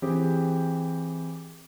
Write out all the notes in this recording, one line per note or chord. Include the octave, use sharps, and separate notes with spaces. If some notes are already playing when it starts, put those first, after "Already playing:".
E3 C4 G4 G#4